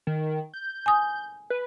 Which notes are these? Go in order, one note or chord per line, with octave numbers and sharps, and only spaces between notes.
D#3
G6
G#5 D#6
B4